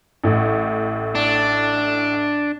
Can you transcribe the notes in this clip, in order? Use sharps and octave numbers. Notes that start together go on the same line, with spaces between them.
A1 A2
D4